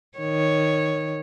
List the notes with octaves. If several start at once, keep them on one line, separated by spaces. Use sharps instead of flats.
D#3 C#5